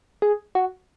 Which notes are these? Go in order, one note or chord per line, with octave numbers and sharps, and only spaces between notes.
G#4
F#4